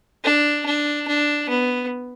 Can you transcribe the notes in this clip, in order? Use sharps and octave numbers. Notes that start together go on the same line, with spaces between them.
D4
D4
D4
B3